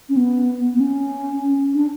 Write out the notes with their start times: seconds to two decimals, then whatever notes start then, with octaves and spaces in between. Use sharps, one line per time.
0.09 C#4
0.16 B3
0.75 B3
0.80 C#4
1.74 D4